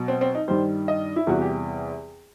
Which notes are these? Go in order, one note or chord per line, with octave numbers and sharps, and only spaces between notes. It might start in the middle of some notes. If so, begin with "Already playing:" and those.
Already playing: B2 F#3
C4
C4
D#4
G2 D#3 G3 C5
D#5
E4
E2 C3 E3 G3 F#4
G4